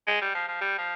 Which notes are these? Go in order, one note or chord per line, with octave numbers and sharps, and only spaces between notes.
G#3
G3
F3
F3
G3
F3